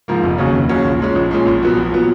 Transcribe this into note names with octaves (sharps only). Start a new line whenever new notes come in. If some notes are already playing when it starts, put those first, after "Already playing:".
G#2 F3 A#3
F1
D#2 C#3 F#3 C#4
F1
D#2 C#3 F#3 C#4
A#1
A#2 G#3 C#4
A#1
A#2 G#3 C#4
A#1
A#2 F#3 B3
A#1
A#2 F#3 B3